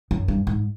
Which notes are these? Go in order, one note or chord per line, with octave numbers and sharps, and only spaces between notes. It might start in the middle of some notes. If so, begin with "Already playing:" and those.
F#2
G2
G#2